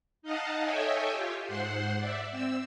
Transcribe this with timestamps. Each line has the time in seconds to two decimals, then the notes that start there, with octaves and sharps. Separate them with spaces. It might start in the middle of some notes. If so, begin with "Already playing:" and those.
0.22 D#4 D#5 F5 F#5 A5
0.62 A4 C#5 D#5 E5 G5 G#5
1.10 F4 G4
1.46 G#2 C5 F#5 C6
1.97 D5 E5
2.31 C4 E6